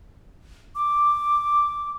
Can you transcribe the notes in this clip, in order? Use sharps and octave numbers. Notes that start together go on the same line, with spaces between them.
D6